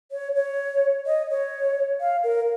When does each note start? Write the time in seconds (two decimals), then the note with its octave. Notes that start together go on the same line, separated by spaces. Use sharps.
0.12 C#5
0.36 C#5
1.06 D#5
1.30 C#5
2.00 F5
2.24 A#4